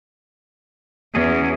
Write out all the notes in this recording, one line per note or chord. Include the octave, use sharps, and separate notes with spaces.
E2 C#4 F#4 G#4